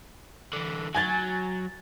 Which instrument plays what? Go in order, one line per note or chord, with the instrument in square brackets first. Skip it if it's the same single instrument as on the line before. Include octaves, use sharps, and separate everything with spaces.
[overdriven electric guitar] D3 E3
[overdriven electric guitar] F#3 [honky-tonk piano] G#5 G#6 A6